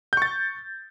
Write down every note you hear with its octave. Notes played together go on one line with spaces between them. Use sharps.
C#6 G6 A6